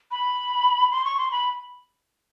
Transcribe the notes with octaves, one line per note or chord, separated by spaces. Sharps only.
B5
C6
C#6
C6
B5